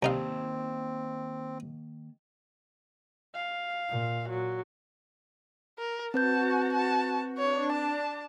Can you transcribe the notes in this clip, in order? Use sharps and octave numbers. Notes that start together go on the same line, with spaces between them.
C2 D#3 A#3 C4 D#4 F5 A5
F5
A#2
F#3
A#4
C4 F#4 B4 A5 G6
A5
D4 C#5
A5